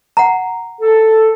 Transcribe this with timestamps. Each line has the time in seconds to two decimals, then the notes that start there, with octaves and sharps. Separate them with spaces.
0.17 F#5 A#5
0.81 A4